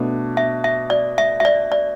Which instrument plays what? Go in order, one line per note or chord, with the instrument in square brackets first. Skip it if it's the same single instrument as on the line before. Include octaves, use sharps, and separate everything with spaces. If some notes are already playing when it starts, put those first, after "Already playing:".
Already playing: [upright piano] B2 A3 D4
[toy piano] E5
E5
D5
E5
E5
D5
D5